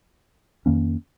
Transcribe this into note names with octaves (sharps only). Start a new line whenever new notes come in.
F2 D#3 A#3 C#4